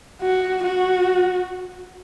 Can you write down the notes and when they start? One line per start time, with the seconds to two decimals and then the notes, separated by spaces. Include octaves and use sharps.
0.22 F#4
0.63 F#4